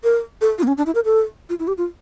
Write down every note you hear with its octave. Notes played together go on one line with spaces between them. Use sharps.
A#4
A4
F4
A#3
C#4
D4
E4
A#4
A4
F4
E4
G4
F4